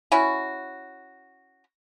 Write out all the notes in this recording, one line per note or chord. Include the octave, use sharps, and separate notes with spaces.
C#4 E4 F#4